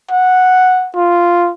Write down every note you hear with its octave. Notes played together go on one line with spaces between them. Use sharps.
F#5
F4